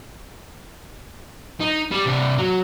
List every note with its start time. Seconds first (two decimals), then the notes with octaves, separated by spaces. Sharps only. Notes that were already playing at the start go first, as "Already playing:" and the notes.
1.61 D#4
1.92 G3
2.05 C3 D4
2.38 F#3